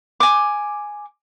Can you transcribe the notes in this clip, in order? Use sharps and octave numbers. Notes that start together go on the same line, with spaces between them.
G#5 D6